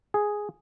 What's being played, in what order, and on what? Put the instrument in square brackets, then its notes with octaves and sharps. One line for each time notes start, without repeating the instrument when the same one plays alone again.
[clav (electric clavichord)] G#4